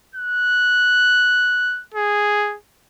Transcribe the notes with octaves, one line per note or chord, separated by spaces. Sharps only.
F#6
G#4